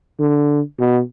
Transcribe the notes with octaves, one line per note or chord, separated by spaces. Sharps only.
D3
B2